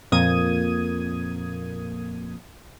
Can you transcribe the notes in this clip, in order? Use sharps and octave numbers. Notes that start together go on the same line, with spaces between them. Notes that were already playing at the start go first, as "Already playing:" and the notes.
F2 A#2 A#3 D#6 G#6 D#7